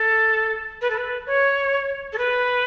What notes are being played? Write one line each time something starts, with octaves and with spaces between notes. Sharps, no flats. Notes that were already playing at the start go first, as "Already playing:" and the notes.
Already playing: A4
B4
A4
B4
C#5
A4
B4